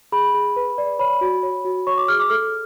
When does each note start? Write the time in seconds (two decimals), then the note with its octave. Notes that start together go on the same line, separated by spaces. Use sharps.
0.12 G#4 B5
0.34 G#4
0.56 B4
0.78 D5
0.99 C#5 B5
1.21 F#4
1.43 C#5
1.65 F#4
1.87 C#5 C#6
1.98 D6
2.08 G#4 F6
2.20 D6
2.30 A4 F6